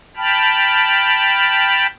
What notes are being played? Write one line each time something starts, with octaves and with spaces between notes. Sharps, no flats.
G5 A5 B5 F6